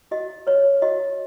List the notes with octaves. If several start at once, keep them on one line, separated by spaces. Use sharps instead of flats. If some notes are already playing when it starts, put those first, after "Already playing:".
F#4 D#5
B4 C#5
F#4 D#5